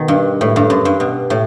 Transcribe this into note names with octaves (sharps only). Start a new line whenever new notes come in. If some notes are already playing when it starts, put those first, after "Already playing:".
Already playing: B2 D#3
G2
A2
G2
F#2
G2
B2
A2